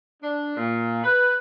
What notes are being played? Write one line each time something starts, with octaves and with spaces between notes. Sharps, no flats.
D4
A#2
B4